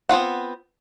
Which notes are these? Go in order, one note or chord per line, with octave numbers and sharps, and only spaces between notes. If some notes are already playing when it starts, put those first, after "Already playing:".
B3 C4 F4 F#5